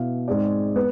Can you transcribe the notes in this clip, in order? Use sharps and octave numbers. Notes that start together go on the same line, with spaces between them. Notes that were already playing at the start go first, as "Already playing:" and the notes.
Already playing: B2 B3 E4 B4 F5
G#2 G#3 C4 G#4 D5
B3